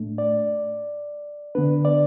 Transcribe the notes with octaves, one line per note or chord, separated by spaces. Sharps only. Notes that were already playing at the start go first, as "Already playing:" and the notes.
Already playing: A2 A3 D4
D5
D3 B3 D4 B4
D5